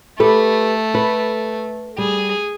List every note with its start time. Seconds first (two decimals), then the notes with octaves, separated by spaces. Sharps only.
0.20 A3 G4 A4 B4
0.94 A4 B4
1.98 G3 G#4